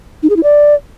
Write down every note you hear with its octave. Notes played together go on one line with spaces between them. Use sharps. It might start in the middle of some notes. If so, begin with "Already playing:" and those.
D#4
G#4
E4
D5